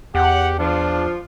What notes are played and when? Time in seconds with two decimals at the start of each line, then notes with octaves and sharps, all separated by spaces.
0.15 E2 G4 F#5
0.59 F3 D4 F4